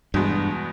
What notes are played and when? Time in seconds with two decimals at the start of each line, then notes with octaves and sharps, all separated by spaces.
0.14 E2 G2 B2 G#3 B3